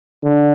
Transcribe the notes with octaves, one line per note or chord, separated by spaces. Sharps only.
D3